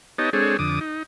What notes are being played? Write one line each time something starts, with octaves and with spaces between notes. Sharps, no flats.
B3 D#4 G4 C#5 D#5 A5
G#3 C4 D4 G#4 A4 C#5
F2 D3 D6 D#6
D#4